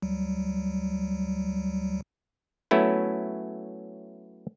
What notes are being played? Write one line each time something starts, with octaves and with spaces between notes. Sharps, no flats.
D2 F#3 G3
F#3 A3 B3 C#4 E4